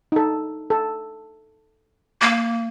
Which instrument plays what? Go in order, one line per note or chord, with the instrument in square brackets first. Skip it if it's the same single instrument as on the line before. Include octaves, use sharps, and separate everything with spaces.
[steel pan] D#4 A4
A4
[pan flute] A#3 [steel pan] D6